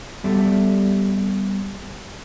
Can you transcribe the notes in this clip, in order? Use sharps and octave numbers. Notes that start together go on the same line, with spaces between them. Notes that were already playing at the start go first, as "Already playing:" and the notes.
G3 B3 G4 A4 D5 E5